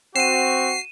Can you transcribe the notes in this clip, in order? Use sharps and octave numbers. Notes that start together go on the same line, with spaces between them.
C4 F#4 C7 D#7 E7